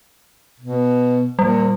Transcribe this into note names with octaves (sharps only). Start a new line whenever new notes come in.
B2
A#2 G3